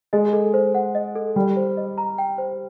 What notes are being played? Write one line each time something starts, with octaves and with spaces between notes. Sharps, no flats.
G#3 D#5
A4
C5
F#5
D#5
A4
G3 G5
C5
D#5
A#5
G5
C5